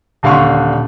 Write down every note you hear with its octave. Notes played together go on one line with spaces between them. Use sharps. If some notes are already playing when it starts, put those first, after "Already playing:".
D#1 D3 F5 C6 C#6